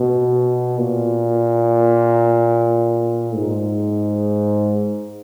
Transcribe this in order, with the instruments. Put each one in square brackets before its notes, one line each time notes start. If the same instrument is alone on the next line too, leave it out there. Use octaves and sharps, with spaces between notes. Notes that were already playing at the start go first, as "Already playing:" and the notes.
Already playing: [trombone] B2
A#2
G#2